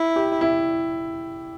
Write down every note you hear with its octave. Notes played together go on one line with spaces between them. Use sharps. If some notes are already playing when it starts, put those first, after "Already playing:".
Already playing: E4
G4
E4